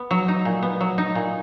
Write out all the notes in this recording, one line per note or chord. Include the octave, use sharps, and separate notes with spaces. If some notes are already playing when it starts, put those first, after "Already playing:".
Already playing: B3
F#3
D#4
A#2
B3
F#3
D#4
A#2